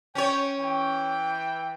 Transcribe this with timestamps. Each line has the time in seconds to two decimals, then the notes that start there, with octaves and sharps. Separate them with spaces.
0.15 C#4 C#5 G5
0.60 E3 G5